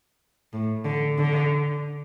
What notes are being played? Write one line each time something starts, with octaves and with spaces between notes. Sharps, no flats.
A2
D3
D3